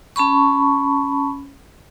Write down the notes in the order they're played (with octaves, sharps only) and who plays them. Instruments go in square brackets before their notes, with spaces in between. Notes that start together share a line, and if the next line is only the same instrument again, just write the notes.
[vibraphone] C#4 A5 B5 C#6